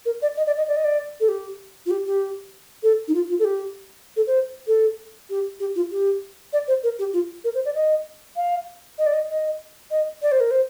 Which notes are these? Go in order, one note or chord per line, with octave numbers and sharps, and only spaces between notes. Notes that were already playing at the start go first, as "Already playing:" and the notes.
A#4
D5
D#5
D5
D#5
D5
D#5
D5
A4
G4
F4
G4
G4
A4
D#4
F4
F4
A4
G4
A4
C5
A4
G4
G4
F4
G4
D5
C5
A#4
G4
F4
A#4
C5
D5
D#5
F5
D#5
D5
D#5
D#5
D#5
D5
C5
A#4
C5